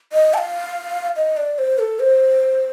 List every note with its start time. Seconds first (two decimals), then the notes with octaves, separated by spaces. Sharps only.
0.13 D#5
0.34 A5
0.38 F5
1.16 D#5
1.37 D5
1.59 C5
1.79 A4
2.00 C5